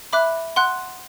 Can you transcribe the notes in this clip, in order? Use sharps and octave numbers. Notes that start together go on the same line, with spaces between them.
E5 B5 D6 F#6
F#5 C6 F#6